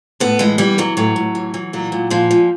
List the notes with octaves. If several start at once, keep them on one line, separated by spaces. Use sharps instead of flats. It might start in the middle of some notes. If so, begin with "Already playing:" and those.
A2 B3
E3 G#3
E3 G3
E3 F#3
A2 F#3
A2
E3
E3
A#2 F#3
A#2
A#2 F3
A#2